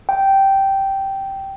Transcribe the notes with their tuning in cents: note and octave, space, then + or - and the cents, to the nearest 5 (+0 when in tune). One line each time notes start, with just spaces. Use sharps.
G5 -10